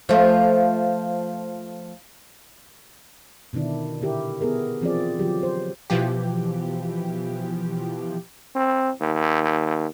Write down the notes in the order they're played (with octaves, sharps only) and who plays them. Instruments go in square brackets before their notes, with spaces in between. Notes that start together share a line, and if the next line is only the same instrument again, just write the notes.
[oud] F3 A3
[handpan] B2 D3 D#3 D4 E4
A#2 D3 E4 G4 A#4
B3 E4 G#4 A#4
E3 F3 C4 F4 G#4 D5
D3 F3 F#3 G4
C5
[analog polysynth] B2 E3 F3 G4
[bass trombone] C4
D#2